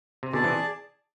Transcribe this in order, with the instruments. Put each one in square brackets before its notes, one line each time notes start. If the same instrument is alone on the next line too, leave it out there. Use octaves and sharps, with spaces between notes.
[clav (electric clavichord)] C3
[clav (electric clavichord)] B2 D3 [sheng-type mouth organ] G#4 D5 A5
[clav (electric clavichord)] C3 E3